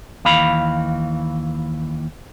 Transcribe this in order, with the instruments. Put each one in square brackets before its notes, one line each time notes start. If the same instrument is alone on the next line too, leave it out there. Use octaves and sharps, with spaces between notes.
[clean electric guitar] D#2 E3 F5 B5